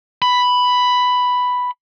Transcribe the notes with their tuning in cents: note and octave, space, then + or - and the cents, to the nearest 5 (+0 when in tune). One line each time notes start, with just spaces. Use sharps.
B5 +5